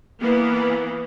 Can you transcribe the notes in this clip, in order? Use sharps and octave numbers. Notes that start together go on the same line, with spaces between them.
E3 A#3 B3